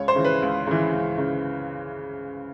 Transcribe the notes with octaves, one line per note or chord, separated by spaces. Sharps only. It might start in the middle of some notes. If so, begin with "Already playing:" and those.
Already playing: C#2 C#5
C5
C#3 E3
B4
C#2
C#3 E3
C#2
C#3